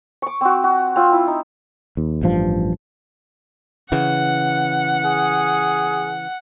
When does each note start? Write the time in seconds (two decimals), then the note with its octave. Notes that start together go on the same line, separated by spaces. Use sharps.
0.22 C#6 D6
0.41 C4 F#4
0.64 F#4
0.96 C4 F4
1.13 E4
1.27 D#4
1.97 D#2
2.22 A1 G2 F3
3.92 C#3 E3 F#5
5.05 G#4